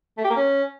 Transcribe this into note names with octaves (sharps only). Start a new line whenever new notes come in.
A3
G4
A#3
C#4